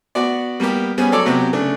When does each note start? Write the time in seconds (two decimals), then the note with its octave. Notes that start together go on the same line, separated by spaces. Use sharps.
0.15 B3 F#4 D5
0.60 G3 A#3 B3 G4
0.98 G3 B3 C#4 G#4
1.12 F#3 A4 C#5 D5 D6
1.26 C3 F#3 B3 G4
1.53 C#3 A3 D4